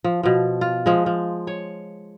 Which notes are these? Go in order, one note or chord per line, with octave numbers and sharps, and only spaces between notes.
F3
B2 F3
F4
F3 G#3
F3
C#5